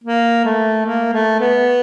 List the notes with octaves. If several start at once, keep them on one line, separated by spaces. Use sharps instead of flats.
A#3
A3
A#3
A3
B3